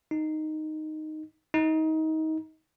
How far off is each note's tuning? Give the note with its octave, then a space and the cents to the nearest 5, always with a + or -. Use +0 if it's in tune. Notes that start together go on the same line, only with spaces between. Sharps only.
D#4 -5
D#4 +25